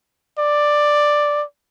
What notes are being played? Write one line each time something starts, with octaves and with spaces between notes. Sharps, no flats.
D5